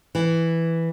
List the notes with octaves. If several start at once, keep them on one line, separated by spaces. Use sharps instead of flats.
E3